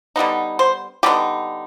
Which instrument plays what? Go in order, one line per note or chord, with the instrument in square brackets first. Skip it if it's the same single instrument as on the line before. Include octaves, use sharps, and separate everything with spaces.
[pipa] D3 G3 B3 D#4
C5
D3 G3 B3 D#4 G4